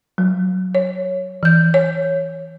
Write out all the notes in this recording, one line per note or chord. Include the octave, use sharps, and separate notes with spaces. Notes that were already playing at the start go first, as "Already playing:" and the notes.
F#3
C#5
E3 G6
C#5